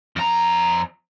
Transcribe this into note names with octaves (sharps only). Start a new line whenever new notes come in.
F2 A#5